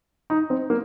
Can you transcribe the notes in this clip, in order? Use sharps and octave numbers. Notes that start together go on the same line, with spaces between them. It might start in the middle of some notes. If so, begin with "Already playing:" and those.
D#4
C4
A#3